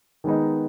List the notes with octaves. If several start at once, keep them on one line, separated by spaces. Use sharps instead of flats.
D#3 G#3 B3 D#4